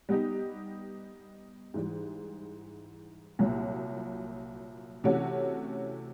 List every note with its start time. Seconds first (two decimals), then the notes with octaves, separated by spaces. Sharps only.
0.09 G3 B3 D#4 G4
1.74 G#2 E3 G3
3.39 C2 A#2 F#3
5.04 C3 E3 A3 C#4 F#4